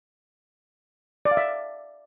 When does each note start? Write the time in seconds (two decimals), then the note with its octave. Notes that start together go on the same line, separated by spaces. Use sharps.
1.25 D5
1.31 F5
1.37 E5